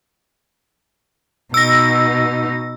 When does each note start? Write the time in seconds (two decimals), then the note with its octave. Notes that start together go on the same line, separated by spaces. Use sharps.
1.54 B2 D#4 E6 A#6